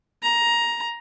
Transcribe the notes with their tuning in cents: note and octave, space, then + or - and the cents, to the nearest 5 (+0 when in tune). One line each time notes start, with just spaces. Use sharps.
A#5 +15